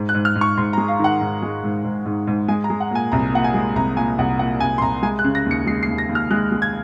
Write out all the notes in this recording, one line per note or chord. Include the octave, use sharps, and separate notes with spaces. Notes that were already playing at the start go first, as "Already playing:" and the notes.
Already playing: G#2
F#6
G#2
F6
G#2
C#6
G#2 C6
A#5
G#3
F5
D#3 F#5
G#2
G#3
G#2
G#2
G#2
G#2
G#3 G#5
A#5
G#3
F#5
A#2 G#5
C2 A#5
A#2 F#5
G#5
G#3
C2 A#5
A#2 G#5
C2 F#5
A#2 F#5
C2 G#5
C6
C2 A#5
G#3 G#5
F#6
C#3
A#6
D#2 C#7
G#3 C7
C7
D#2
A#6
D#2
F6
G#3 F#6
G#3
G#6